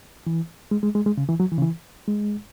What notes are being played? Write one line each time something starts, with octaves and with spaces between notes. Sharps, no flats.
E3
G#3
G#3
G#3
G#3
C#3
E3
F#3
E3
C#3
E3
G#3